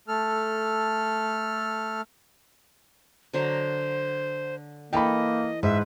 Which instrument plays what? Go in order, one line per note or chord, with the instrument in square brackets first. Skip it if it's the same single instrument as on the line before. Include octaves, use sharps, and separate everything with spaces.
[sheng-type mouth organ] A3 A4 F6
[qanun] D3 F#3 A#5 [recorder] C5
[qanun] E3 A4 A#5 [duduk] A#3 [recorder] D#5 [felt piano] G5 B5
[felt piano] G#2 [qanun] B4 [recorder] E5